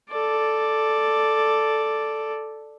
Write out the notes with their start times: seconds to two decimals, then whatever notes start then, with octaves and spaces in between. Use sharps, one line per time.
0.10 A4 D5